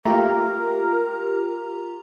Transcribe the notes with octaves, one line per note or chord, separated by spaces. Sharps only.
A3 A#3 F4 G4 A#4 A#5